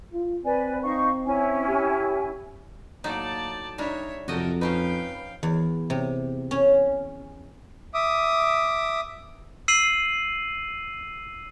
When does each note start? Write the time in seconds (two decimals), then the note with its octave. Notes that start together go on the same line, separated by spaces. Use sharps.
0.13 F4
0.45 C4 B4 D5 G#5
0.83 D#4 F5 C#6
1.25 C#4 E4 G#5
1.68 G4
3.04 A2 F#3 A#3 D#4 D5 A5
3.78 G3 D4 D#4 A#4 C#5 E5
4.28 F2 C3 F#4 A4 A#4 D#5 G5
4.61 F3 C#4 D#4 B4 F5 G5
5.43 E2
5.90 C3
6.51 C#4
7.94 E5 D6 D#6
9.68 E6 C7 D#7 F#7